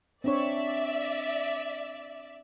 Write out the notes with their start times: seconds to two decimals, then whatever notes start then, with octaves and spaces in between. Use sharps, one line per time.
0.24 C4 D4 C#5 D5 E5